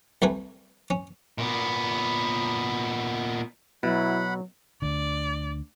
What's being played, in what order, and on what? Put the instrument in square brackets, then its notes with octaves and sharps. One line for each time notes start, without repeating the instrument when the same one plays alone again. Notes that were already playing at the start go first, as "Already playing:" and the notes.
[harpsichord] C2 G3 A3 B4 G#5
C#4
[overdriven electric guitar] A#2 B3
[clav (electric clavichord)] B2 [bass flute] F#3 [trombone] E4 [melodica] F#5 B5
[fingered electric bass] D2 D3 [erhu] D5